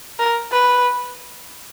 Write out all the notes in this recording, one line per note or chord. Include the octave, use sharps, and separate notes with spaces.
A#4
B4